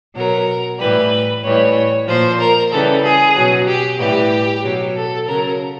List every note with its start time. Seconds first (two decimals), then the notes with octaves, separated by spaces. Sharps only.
0.16 B2 F#3 A#4
0.80 A2 E3 G3 B4
1.43 A2 E3 G3 C#5
2.07 A#2 F3 C5
2.40 A#4
2.71 C#3 E3 G3 A4
3.03 G#4
3.35 B2 F#3
3.67 G4
3.99 A2 E3 G3 G4
4.63 B2 F#3
4.95 A4
5.27 C#3 F#3 A#4